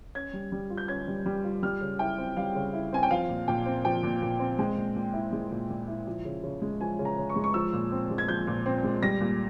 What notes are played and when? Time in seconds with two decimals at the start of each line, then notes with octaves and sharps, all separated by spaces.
0.15 C#4 G#6
0.33 G3
0.52 G3
0.70 F4
0.77 G6
0.88 C#4 G#6
1.07 G3
1.26 G3
1.44 F4
1.63 G3 F6
1.81 C#3
1.99 E4 G5
2.18 C4
2.37 G3 F5
2.55 C#3
2.73 E4
2.92 C4 G#5
3.03 G5
3.10 F3 F5
3.29 A#2
3.48 A#2 G5
3.66 C4
3.85 F3 G5
4.03 A#2
4.22 A#2
4.40 C4
4.59 G#3 G5
4.77 A#2
4.95 A#2
5.13 E4
5.32 G#3
5.51 A#2
5.69 A#2
5.88 E4
6.07 F3
6.25 C#3
6.43 C#3
6.62 G#3
6.81 F3 G#5
6.99 C#3
7.05 A#5
7.18 C#3
7.30 C#6
7.36 G#3
7.44 C#6
7.54 F3 E6
7.73 A#2
7.92 C4
8.10 G#3
8.18 G#6
8.28 F3 G6
8.47 A#2
8.66 C4
8.84 G#3
9.02 G3 A#6
9.20 A#2